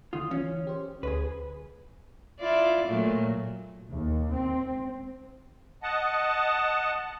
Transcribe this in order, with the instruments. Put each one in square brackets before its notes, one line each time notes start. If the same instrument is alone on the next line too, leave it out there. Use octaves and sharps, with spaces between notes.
[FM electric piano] D3 D#3 D#6 [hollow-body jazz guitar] F4
[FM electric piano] E3 [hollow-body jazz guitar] C#4
[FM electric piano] G4 C5
[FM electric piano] D2 [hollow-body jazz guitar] G#4 B4
[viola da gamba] E4 F4 D5
A#2 F#3 A3
[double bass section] D#2
C4
[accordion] D#5 F#5 A5